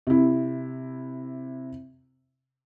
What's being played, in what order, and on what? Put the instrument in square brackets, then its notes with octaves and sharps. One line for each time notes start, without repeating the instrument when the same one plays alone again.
[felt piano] C3 E4